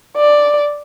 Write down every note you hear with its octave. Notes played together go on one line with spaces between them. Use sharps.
D5